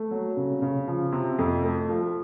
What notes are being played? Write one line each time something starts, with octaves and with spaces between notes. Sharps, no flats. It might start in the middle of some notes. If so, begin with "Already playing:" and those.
Already playing: A3
F#3
C#3
C#3
F3
C3
F2
A3
F3